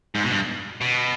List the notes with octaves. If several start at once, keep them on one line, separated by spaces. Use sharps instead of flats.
G#2
B2
G2
B2